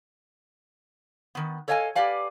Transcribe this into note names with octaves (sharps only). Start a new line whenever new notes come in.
D#3 B3
A4 C#5 D#5 F5 G5 G#5
G4 B4 D5 F5 G#5